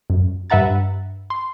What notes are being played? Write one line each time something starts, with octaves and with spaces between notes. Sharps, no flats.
F#2
G2 B4 E5 F#5 A#5 A6
C6